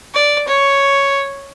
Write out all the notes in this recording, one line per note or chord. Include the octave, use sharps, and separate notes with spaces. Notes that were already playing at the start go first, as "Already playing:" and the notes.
D5
C#5